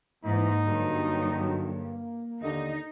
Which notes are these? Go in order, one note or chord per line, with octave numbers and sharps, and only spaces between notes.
G#2 E3 A#3 D#4
G2 D3 F#3
D#2 D3 D#4 D#5